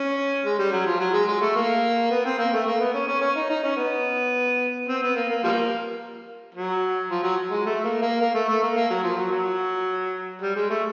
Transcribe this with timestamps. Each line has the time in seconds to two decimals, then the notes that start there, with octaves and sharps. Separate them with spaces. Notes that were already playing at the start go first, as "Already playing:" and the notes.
Already playing: C#4
0.45 G#3
0.59 G3
0.72 F#3
0.86 F3
1.00 F#3
1.13 G#3
1.28 G#3
1.41 A3
1.56 A#3
2.10 B3
2.25 C4
2.38 A#3
2.53 A3
2.66 A#3
2.80 B3
2.94 C#4
3.08 C#4
3.21 C#4
3.36 D#4
3.49 D#4
3.63 C#4
3.77 B3
4.88 C4
5.02 B3
5.16 A#3
5.30 A#3
5.44 F3 G3 A#3
6.55 F#3
7.10 F3
7.23 F#3
7.51 G#3
7.66 A3
7.84 A#3
8.02 A#3
8.21 A#3
8.34 A3
8.49 A3
8.63 A#3
8.77 A#3
8.90 F#3
9.03 F3
9.17 F#3
9.31 F#3
10.42 G3
10.56 G#3
10.70 A3